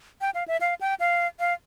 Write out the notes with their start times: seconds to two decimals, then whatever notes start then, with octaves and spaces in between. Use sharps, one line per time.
0.21 G5
0.35 F5
0.48 E5
0.61 F5
0.81 G5
1.00 F5
1.40 F5